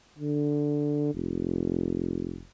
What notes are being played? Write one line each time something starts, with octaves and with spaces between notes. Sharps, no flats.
D3
F1